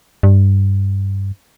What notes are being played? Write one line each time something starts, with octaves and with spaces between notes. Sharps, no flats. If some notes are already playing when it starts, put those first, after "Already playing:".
G2